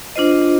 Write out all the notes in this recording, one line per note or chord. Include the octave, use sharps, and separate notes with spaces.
D4 F4 C5 D#5